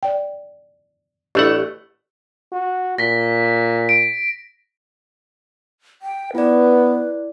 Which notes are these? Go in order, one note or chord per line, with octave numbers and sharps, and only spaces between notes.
D5 G5
A1 A3 D4 E4 G4 F#5
F#4
A#2 A#6 B6
D7
G5
B3 E4 B4 D5